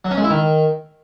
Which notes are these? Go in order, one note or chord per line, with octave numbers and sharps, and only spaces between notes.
F#3
C#4
G#3
E4
D#3